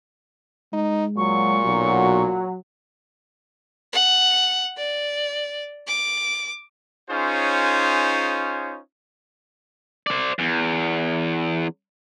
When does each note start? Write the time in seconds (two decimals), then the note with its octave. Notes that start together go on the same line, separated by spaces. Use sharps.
0.73 G#3 D#4
1.17 A#2 F#3 C#6
1.65 B1 F#3
3.93 F#5
4.77 D5
5.87 D6
7.10 C#4 D#4 F4 G#4 C5 C#5
10.07 C5 D5
10.39 E2